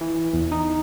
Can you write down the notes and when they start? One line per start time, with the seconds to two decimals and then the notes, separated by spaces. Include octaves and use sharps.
0.01 E3
0.33 E2
0.52 D#4